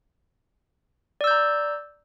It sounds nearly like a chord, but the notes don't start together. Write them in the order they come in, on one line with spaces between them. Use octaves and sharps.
D5 E6 G6 A#5